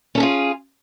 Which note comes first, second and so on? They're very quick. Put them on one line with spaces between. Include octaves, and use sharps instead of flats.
C#4 A4 G#4 F4